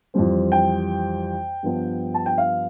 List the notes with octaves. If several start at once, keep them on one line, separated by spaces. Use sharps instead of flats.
F2 E3 G3 C4
G5
G2 F3 B3 D4
A5
G5
F5